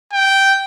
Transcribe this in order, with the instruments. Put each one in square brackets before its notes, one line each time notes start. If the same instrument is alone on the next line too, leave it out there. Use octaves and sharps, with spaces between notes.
[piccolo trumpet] G5